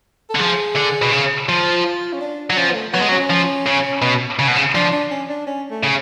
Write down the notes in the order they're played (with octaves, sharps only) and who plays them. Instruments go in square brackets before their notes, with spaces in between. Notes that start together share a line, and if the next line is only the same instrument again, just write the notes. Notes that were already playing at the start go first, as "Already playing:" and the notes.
[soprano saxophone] A4
[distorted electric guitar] D3
[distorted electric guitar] F3 [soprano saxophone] G#4
[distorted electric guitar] D3
B2
C#3
F3
[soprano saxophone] F4
C#4
D4
[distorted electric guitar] F#3
[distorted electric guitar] F3 [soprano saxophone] C#4
[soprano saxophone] B3
A3
[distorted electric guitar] F#3 [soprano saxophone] B3
[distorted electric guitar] G#3
F#3
[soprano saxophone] C#4
[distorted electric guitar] F3
C#3
B2
C#3
B2
C#3
[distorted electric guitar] F3 [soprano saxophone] D4
[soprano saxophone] D4
C#4
D4
C#4
A3
[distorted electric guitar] C#3